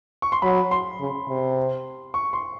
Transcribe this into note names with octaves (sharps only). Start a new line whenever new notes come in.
C#6
C6
F#3 B5
C6
C#3
C3
C#6
C6